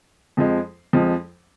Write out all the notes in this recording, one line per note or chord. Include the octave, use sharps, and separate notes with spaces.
F2 F3 G#3
F2 F3 G#3